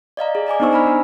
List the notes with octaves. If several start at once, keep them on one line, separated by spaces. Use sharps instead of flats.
D5 D#5 F5 A#5
G#4
D5 D#5 G#5 D6
B3 D4 D#4 C5 C#6 E6
G#5 A#5 B5 F6
D4